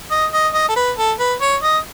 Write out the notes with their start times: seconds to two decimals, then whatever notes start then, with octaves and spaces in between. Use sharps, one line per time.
0.11 D#5
0.33 D#5
0.54 D#5
0.69 A4
0.76 B4
0.97 A4
1.19 B4
1.41 C#5
1.63 D#5